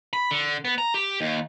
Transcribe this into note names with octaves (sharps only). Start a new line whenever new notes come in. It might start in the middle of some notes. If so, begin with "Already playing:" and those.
B5
D3
B3
A#5
G4
D#2